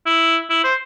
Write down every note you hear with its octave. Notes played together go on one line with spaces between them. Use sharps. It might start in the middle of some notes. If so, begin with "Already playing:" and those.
E4
E4
C5